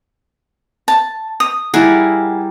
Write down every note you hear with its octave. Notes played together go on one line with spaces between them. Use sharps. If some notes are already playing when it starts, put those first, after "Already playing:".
A5
D#6
G3 E4 G#4 A#4 F#5